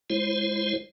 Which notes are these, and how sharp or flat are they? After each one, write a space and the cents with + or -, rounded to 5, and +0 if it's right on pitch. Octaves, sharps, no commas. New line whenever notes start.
G#3 +0 E4 +40 C5 +20